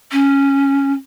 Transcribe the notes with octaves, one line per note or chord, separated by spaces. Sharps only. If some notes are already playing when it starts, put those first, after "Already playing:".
C#4